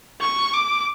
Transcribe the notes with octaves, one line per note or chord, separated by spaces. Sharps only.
C#6
D6